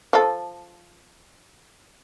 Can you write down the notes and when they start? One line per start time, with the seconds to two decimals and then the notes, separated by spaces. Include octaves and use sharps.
0.13 F3 A4